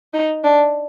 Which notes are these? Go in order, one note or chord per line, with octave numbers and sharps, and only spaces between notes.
D#4
D4